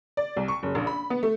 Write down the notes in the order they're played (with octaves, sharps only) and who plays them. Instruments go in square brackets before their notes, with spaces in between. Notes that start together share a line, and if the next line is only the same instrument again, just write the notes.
[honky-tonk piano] D5
C2
C#6
F#1
A#1
B5
B3
A3